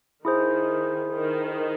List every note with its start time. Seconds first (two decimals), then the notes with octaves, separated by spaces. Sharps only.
0.25 D#3 E4 G#4 C5
1.13 D#3